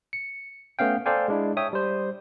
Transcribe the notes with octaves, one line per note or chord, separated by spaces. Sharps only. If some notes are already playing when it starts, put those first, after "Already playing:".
C#7
A3 B3 C#4 F5 G5
A4 C5 D5 F5 G5 G#5
G#3 D4 E4
C#5 E5 G5 D#6
G3 C5